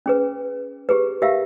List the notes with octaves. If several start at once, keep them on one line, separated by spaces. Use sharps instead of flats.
C#4 G#4 B4
G4 G#4 B4
G4 A#4 E5 F5